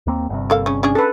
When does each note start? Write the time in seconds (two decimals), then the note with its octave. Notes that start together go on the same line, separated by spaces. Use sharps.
0.07 D#2 A#3 C4
0.29 G1 G2 C3
0.50 A#3 A4 F5
0.66 C#3 C#4
0.83 C#4 D4 G#4
0.95 A4 B4